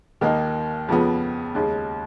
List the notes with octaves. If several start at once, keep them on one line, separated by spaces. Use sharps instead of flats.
D#2 D#3 A#3 D#4
F2 C#3 F3 B3
D#2 C#3 G#3